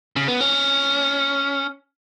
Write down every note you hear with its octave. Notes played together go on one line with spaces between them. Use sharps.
C#3
B3
C#4